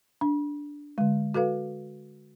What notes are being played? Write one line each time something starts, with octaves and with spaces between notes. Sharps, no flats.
D4
D3 G#3
F#4 A4 B4 F5